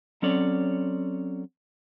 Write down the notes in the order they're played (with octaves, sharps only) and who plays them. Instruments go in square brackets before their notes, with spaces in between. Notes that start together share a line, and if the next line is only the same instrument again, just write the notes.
[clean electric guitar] F#3 C4 C#4 A4 C#5 D5